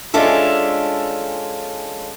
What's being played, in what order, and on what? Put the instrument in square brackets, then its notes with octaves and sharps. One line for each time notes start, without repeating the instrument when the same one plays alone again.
[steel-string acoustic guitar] G#3 C#4 D4 F4 A4 E5